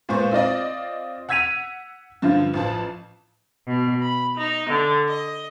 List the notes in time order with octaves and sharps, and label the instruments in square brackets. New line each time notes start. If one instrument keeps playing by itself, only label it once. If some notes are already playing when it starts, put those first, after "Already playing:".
[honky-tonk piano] A#2 G#3 B3 C5 C#6
C4 F4 D5 D#5
F#5 E6 G#6 B6 D#7 F7
G2 D3 F3 F4
A1 F3 A5
[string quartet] B2
B5
D#4
D3
D#5